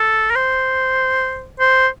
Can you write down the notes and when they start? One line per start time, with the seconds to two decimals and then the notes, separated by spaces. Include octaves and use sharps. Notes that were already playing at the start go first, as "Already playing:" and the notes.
Already playing: A4
0.31 A#4
0.36 C5
1.60 C5